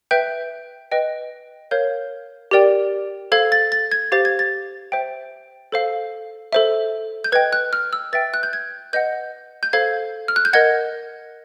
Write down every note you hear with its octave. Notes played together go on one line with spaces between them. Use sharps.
B4 E5 G5 G6
B4 D#5 G5
A#4 C#5 F5 G6
G4 A#4 D5 G5
A4 C5 F5 G#6
A6
A6
G#6
G4 C5 F5 A6
G#6
A6
C5 E5 G5
A4 C5 F5
A4 C5 E5
G6
B4 D#5 G5 G#6
F#6
F6
E6
B4 E5 G5 A6
F#6
G6
G#6
B4 D#5 F#5 G6
G6
A4 C5 F5 G#6
F6
F#6
G6
A#4 D#5 F#5 G#6